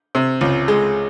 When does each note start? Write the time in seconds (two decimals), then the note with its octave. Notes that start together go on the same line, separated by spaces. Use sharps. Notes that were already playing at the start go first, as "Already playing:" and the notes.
0.15 C3
0.41 C#2
0.68 G#3